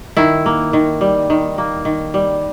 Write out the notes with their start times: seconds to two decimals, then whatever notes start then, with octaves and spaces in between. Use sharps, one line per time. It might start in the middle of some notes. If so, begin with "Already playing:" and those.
0.17 D#3 E4
0.46 A#3
0.73 D#3
1.01 G3
1.30 D#3
1.58 A#3
1.85 D#3
2.14 G3